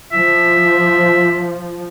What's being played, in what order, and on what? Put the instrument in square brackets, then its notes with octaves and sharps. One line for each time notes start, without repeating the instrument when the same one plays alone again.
[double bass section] F3 [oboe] E5